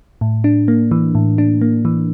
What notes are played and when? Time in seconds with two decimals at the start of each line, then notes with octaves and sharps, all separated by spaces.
0.21 A2
0.44 D4
0.68 A#3
0.91 E3
1.15 A2
1.38 D4
1.61 A#3
1.85 E3